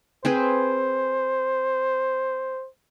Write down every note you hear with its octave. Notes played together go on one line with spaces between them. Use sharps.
C4 G#4 B4 C5